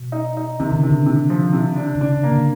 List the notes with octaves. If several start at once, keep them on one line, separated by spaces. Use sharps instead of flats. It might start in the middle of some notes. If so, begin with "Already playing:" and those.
Already playing: B2
D#4
D#4
C3 D#3
C#3
D3
C3
D3
C3
F3
C3
D4
C#3
C3 D4
C#3
A#3
D3